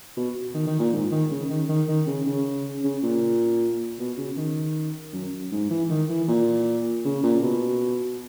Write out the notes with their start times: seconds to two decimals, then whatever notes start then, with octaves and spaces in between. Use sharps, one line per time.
0.17 B2
0.54 D#3
0.67 D#3
0.79 A#2
0.93 G#2
1.11 D#3
1.31 C#3
1.50 D#3
1.69 D#3
1.88 D#3
2.07 C#3
2.26 C#3
2.84 C#3
3.03 A#2
3.99 B2
4.18 C#3
4.37 D#3
5.13 F#2
5.52 G#2
5.70 E3
5.90 D#3
6.09 E3
6.28 A#2
7.05 C#3
7.23 A#2
7.43 B2